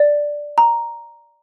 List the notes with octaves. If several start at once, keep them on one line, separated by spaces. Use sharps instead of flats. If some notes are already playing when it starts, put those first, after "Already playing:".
Already playing: D5
A#5